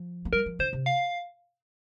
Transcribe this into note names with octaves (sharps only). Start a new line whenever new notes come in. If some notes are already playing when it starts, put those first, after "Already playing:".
Already playing: F3
A#3
G3 A#4
F3
D3 C5
C3
F5